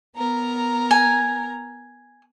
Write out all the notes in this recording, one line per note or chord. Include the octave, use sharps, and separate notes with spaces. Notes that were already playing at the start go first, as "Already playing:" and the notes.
B3 A#4 A#5
G#5